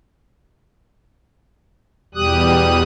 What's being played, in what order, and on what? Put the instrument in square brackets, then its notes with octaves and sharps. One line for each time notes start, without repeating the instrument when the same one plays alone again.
[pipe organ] E2 B2 G3 G4 D#6 F#6